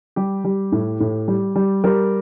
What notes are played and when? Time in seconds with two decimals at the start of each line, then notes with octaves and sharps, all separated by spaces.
0.16 G3 G4
0.44 G3
0.72 A2
1.00 A2
1.28 G3
1.56 G3
1.84 G3 A#4